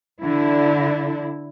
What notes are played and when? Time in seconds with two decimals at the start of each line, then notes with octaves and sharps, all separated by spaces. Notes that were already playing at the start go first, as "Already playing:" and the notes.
0.20 D3 E4